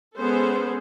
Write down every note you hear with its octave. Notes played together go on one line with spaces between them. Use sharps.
G#3 B3 C#4 G#4 A4 C5